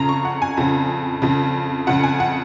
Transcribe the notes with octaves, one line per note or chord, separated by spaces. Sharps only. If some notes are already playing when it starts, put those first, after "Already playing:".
Already playing: F2 C#3 A#5
C#6
F#5
G#5
F2 C#3
F2 C#3
F2 C#3 F#5
G#5
F#5